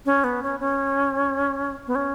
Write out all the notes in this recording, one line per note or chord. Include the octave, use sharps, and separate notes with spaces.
C#4
B3
C#4
C#4
B3
C#4